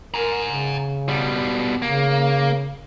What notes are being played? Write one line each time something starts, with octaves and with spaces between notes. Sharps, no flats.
A#4 G#5 A#5
C#3
B2 G3
C#3 A#3